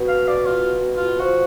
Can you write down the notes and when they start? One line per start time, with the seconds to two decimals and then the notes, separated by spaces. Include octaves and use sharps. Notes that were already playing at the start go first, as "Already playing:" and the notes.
Already playing: B2
0.08 F5
0.28 D5
0.46 F4
0.96 F4
1.20 F3 F#4